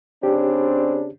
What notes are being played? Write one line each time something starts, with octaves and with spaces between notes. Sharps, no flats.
C#3 C4 D4 G4